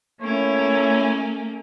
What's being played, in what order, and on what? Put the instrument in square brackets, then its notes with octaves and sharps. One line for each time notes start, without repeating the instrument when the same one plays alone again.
[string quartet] A3 A#3 C#4 [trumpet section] E4 C#5